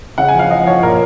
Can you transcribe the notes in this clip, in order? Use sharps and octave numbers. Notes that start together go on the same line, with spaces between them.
C#3 F#5
G#5
F3 F5
F3 D#5
F3 C#5
A#2 A#4